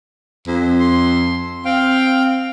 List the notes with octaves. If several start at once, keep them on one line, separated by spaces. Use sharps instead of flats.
F2
C6
C4 F5 G5